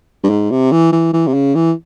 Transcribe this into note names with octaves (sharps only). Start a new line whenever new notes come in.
G2
G#2
C3
E3
E3
E3
C3
C#3
E3